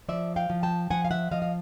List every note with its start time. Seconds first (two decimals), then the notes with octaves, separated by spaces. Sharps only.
0.09 F3 D5 E5
0.36 F5 G5
0.50 F3
0.63 G5 A5
0.91 F3 F#5 G#5
1.05 F5
1.11 E5 F#5
1.32 F3 D#5 F5
1.42 F5